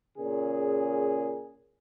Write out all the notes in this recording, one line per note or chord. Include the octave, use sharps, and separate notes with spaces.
A#2 C#3 G#4